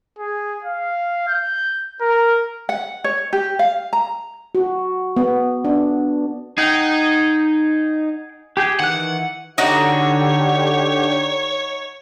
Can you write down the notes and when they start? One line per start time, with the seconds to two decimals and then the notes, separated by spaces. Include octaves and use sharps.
0.19 G#4
0.64 F5
1.28 G6
2.01 A#4
2.69 F#5
3.04 C#5
3.33 G4
3.59 F5
3.93 A#5
4.55 F#4
5.16 B3
5.65 D4
6.58 D#4 G#4 F#5 G5
8.57 G4 G#4 G5
8.80 D#3 E3 F#5 F#6
9.58 D3 D#4 F#4 G4 C#5